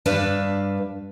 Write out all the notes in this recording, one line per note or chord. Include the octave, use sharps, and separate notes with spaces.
G2 D4 B4 E5 F5